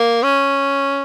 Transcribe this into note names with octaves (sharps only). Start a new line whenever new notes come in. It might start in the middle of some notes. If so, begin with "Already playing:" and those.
Already playing: A#3
C#4